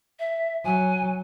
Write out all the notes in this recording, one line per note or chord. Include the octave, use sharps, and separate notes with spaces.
E5
F#3 G#5